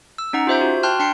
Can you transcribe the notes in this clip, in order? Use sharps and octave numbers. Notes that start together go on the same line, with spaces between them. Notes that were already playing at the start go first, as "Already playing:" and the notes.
E6
C#4 D#4 F#5 A#5
F4 G4 C5 E5 G6
F#4
G5 A5 C6 F6 F#6
D4 G5 A5 C6 C7 C#7